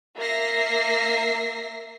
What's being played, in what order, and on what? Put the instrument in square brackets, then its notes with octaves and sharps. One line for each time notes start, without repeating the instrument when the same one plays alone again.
[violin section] A#3 E5 A#6 C7